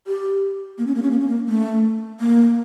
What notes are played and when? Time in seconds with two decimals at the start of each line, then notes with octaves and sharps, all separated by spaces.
0.07 G4
0.78 A#3
0.87 C#4
0.95 A#3
1.03 C#4
1.11 A#3
1.20 C#4
1.28 A#3
1.48 A3
2.20 A#3